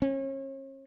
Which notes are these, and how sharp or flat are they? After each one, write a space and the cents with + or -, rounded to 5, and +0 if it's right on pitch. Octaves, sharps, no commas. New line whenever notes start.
C#4 -40